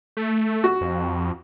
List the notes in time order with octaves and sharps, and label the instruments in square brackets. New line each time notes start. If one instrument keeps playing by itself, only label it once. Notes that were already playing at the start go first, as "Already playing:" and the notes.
[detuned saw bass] A3
[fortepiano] F#4
[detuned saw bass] F2